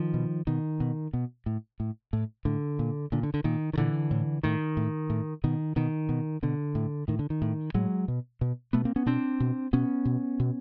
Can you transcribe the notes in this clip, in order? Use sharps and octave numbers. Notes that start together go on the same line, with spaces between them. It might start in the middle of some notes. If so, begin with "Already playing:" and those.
Already playing: D#3 F3
B2
B2 D#3
B2
B2
A2
A2
A2
A2 D3
A#2
A#2 D3
D3
D3
A#2 D#3
D#3
A#2 D3 E3
A2
A2 D#3
A2
A2
B2 D#3
B2 D#3
B2
B2 D3
A2
A2 D#3
D3
D#3
A2
A2 F#3 G#3
B2
B2
B2 A3 B3
A#3 C4
B3 C#4
B2 C4 D4
B2
B2 B3 C#4
B2
B2